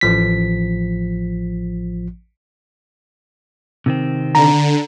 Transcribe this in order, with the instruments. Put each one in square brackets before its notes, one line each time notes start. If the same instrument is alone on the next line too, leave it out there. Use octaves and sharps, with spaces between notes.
[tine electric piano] A1 F3 B6
[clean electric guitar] C3 D#3 C4
[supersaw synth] D3 [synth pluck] A#5